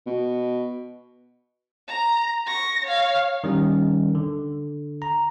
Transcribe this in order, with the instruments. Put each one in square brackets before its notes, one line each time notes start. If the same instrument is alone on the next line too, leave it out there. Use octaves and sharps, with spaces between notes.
[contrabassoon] B2
[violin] A#5
C#6 A#6
C#5 F5
[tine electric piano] D#3 G3 C#4
D3
A#5